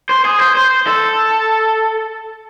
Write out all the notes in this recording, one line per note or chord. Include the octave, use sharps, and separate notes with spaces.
C5
G#4
C5
C5
A4